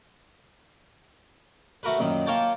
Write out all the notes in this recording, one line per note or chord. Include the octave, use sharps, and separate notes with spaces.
A3 F#4 A#4 B4
F#2 A#2 D#3
A#3 F4 A#4 C#5 G5 A5